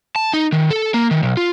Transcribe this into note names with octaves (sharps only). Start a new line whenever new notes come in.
A5
D#4
D#3
A4
A#3
D#3
B1
F4